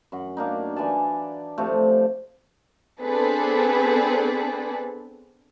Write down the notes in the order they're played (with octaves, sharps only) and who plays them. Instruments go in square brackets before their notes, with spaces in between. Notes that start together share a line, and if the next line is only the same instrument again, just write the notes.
[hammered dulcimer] F#2 F#5
A#3 D4 D#4
E3 D5 G#5 A5
C3 F3 A3
[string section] B3 C4 D4 G#4 A4 B4